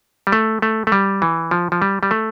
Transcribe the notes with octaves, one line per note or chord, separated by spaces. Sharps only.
G3
A3
A3
A3
G3
E3
F3
F3
G3
G3
A3